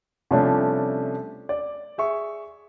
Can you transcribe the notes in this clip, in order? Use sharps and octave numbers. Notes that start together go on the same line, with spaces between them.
C3 F3 G3 A3 C#4 D4
D5
G#4 E5 C#6